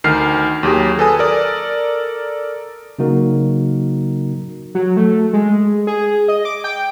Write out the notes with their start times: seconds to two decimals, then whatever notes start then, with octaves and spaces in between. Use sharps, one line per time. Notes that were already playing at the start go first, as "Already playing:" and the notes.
0.04 D2 D#3 F6 C7
0.63 D#2 F#3 G4 G#4
0.99 A4 B4 G#5 D#6
1.18 A4 A#4 D5
2.99 C#3 F#3 A#3 D#4 F#4 A#4
4.75 F#3
4.97 A3
5.33 G#3
5.87 G#4
6.28 D#5
6.45 D6
6.64 G5